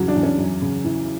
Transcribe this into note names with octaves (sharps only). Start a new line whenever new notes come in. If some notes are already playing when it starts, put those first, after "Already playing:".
Already playing: E2 G2 C#3 F#3 C#4 F#4
D4
E2
C#4
F#2
C#3
E3